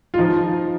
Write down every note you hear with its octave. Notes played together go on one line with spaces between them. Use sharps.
F4
F3 D#4